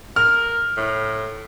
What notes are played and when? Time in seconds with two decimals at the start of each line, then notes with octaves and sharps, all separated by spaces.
0.16 A#4 F6
0.77 A2